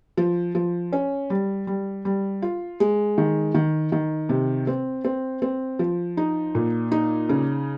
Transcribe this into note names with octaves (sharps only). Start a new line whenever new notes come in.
F3
F3
C#4
G3
G3
G3
F4
G#3
D#3
D#3
D#3
C3
C4
C4
C4
F3
D#4
A#2
D#4
C#3